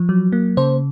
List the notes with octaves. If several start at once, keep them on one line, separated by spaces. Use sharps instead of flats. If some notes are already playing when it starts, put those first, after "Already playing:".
Already playing: F3
F#3
A#3
C#3 C5